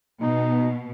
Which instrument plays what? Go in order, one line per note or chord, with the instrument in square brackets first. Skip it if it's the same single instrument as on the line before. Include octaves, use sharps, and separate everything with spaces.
[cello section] B2 [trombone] D#4